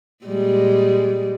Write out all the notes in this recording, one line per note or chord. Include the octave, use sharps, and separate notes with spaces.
A#2 G3 G#3